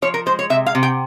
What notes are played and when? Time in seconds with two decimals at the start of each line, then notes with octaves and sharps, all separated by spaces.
0.02 F3 C#5
0.14 A#4
0.26 G#3 C5
0.39 C#5
0.50 C3 E5
0.66 F5
0.75 C3
0.83 G5